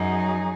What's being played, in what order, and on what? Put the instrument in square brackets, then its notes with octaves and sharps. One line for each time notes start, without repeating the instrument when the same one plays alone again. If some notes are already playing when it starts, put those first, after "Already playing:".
Already playing: [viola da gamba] F#2 [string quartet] F#3 D#4 G#4